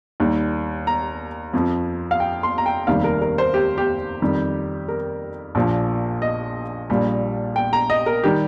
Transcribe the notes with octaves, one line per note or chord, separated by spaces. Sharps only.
D#2 D#3 G3
A#5
F2 F3
F5
G5
C6
A#5
G5
F1 D#2 D#3 G3 F5
A#4
A#4
C5
G4
G4
F2 D#3 G3
A#4
A#1 A#2 F3
D#5
A#1 A#2 G3
G5
A#5
D#5
A#4
D#3 G3 G4